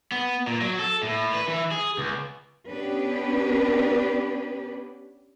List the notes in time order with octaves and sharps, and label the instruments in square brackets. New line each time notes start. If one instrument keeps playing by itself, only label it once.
[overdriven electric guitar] B3
A#2
F#3
A4
A2
B4
E3
G#4
C#2
[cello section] B3 C#4 D4 G4 B4